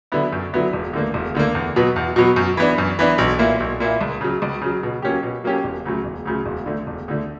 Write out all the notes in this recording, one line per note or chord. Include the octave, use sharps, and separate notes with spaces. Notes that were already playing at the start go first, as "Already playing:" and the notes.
D3 F#3 B3 E4
F#2
D3 F#3 B3 E4
E1
D2 D3 A#3
E1
D2 D3 A#3
E2
B2 F#3 B3
E2
B2 F#3 B3
F#2
E3 B3 D4
F#2
E3 B3 D4
B1
A#2 A#3 E4
B1
A#2 A#3 E4
C#2
C#3 F#3
C#2
C#3 F#3
B2
F#3 A#3 C#4 G4
B2
F#3 A#3 C#4 G4
E1
D2 C#3 F#3
E1
D2 C#3 F#3
E1
D2 D3
E1
D2 D3